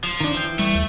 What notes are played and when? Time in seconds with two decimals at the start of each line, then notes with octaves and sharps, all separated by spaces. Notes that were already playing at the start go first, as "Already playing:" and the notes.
0.04 F3
0.21 D#3 D4
0.34 E3 G5
0.59 G3 A3
0.75 D#2